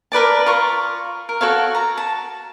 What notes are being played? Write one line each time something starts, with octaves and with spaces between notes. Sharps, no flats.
A#4 B4 D5 A5
F4 A#5 C#6
A#4
F#4 A4 C#5 F5
A#5
A5